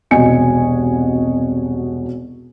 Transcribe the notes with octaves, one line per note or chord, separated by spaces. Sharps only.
E1 C2 F#4 D#5 G#5 C#7